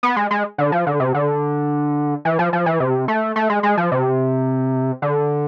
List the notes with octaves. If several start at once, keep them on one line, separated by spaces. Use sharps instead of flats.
B3
G#3
G#3
D3
F3
D3
C3
D3
E3
F3
F3
E3
C3
A3
A3
G#3
G#3
F3
C3
D3